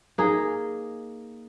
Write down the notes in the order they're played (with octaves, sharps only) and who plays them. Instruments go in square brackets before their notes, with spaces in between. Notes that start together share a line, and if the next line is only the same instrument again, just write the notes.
[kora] A#3 D#4 G#4